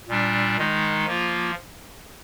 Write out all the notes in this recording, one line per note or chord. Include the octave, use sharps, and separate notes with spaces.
A#2 G3 D4
D#3 G#3 D#4
F3 A#3 F4